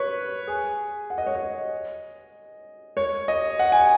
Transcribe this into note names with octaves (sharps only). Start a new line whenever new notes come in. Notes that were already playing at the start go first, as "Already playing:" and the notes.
Already playing: B4 C#5
G#4
F#5
D#5
C#5
D#5
C#5
D#5
F#5
G#5